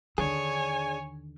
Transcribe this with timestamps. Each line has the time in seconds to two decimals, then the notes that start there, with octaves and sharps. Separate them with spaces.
0.18 D#2 D3 D4 G#4 C#5 G#5